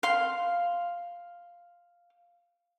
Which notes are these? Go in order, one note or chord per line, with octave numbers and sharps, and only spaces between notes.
F5 C6